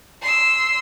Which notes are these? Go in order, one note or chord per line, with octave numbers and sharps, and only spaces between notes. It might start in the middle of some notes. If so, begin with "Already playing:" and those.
C6 E6